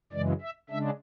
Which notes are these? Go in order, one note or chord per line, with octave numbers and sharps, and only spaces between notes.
F#2 C#3 E3 G#3 D5
E5
C#3 G#3 D4 E5